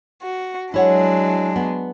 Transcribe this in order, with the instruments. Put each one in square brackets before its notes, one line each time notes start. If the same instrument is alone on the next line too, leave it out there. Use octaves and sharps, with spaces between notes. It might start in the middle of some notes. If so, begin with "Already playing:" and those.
[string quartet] F#4
[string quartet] F#3 G#3 D4 [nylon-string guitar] E4 C#5 F#5
[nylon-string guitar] B3